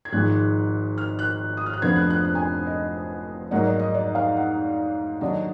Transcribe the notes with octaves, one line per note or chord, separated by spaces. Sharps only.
G#6
G#1 G#2 F3 G#3 F#6
F6
F#6
D#6
F6
F#6
F1 F2 D3 F3 B3 G#6
F#6
F#6
F#6
G#5
D#5
G#2 F#3 A#3 D#4 F#5
D5
D#5
D5
F5
F#5
D#2 D3 F#3 D4 D#5